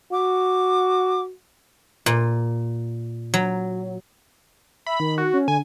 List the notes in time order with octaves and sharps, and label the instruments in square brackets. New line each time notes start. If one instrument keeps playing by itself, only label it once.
[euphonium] F#4 [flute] D6
[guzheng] A#2
F#3
[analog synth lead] E5 [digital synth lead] B5
[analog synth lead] D#3
[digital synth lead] F#4
[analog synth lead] C#4
[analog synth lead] D3 [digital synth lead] G#5